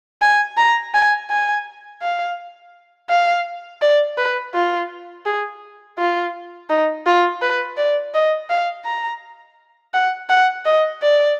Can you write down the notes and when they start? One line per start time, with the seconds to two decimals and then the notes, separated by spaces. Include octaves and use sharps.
0.22 G#5
0.58 A#5
0.95 G#5
1.30 G#5
2.02 F5
3.10 F5
3.82 D5
4.18 B4
4.55 F4
5.26 G#4
5.98 F4
6.70 D#4
7.06 F4
7.42 B4
7.77 D5
8.14 D#5
8.50 F5
8.85 A#5
9.94 F#5
10.30 F#5
10.66 D#5
11.02 D5